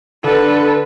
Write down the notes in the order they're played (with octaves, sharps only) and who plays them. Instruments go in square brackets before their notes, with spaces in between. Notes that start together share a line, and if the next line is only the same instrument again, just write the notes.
[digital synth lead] D3 [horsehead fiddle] A4 B4